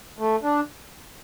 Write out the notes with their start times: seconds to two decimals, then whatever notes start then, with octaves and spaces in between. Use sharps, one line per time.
0.19 A3
0.43 D4